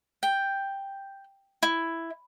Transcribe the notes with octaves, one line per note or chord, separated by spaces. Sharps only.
G5
E4